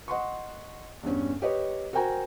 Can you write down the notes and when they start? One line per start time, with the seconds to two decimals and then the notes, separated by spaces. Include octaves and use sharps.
0.08 D#5 F#5 C6 C#6
1.03 E2 G2 C#4
1.42 G4 B4 C#5 D#5
1.93 F#4 A#4 C5 G5 G#5 A#5